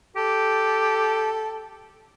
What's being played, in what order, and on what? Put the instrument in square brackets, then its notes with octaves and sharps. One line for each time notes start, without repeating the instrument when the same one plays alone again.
[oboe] G4 [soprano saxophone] A4